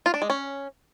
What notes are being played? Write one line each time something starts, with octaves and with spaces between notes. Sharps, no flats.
F4
D4
G#3
C#4